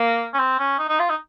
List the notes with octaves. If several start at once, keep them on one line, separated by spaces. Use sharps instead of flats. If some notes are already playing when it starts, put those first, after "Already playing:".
Already playing: A#3
C#4
C4
C#4
D#4
D#4
F4
D#4